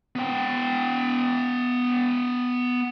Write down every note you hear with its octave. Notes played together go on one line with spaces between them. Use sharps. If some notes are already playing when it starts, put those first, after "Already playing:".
B3 G5